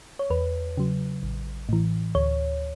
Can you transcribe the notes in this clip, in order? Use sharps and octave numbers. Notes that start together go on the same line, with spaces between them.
C#5
E2 B4
C#3 F#3
A1
A2 E3
D2 C#5